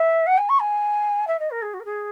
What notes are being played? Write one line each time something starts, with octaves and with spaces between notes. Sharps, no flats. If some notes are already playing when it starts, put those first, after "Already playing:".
Already playing: E5
F#5
G#5
C#6
G#5
E5
D#5
A#4
G#4
F#4
A#4
G#4